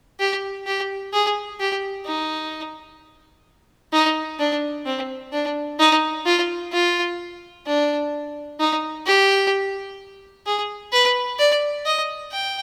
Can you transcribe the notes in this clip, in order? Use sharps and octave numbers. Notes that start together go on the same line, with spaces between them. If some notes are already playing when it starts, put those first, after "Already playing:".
G4
G4
G#4
G4
D#4
D#4
D4
C4
D4
D#4
F4
F4
D4
D#4
G4
G#4
B4
D5
D#5
G5